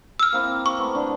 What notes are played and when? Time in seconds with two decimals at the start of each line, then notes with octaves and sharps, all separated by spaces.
0.20 E6 F6
0.32 A#3 C4 E4
0.66 C#6
0.79 A3 B3
0.95 D3